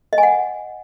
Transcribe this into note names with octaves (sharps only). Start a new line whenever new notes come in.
D#5
G#5
F#5